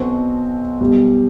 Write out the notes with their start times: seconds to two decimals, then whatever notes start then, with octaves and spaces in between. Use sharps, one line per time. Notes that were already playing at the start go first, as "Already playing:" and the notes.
Already playing: B1 B2 F#3 C4 F#4
0.81 B1 B2 G3